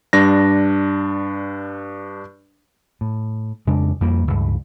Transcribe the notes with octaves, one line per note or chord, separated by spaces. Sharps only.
G2 D4 A#6
A2
F2 C#3 G#3 D4
F2 F3 G3 A#3
C#2 G2